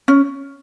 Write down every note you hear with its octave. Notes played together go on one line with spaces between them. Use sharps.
C#4